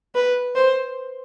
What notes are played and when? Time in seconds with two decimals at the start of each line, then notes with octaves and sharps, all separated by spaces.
0.15 B4
0.56 C5